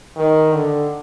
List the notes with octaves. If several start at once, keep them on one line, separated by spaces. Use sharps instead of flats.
D#3
D3